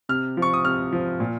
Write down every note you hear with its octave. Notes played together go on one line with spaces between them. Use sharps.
C3 F6
F3
C#6
D#6
C3 F6
F3
A#2